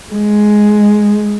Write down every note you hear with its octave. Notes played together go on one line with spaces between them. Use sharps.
G#3